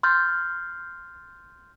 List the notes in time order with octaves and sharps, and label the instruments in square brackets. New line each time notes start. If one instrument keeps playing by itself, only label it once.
[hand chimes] C6 F6 G6 A6